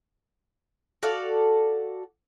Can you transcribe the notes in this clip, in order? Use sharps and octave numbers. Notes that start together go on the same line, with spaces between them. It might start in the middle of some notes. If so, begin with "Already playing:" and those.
F#4 A4 D5 F5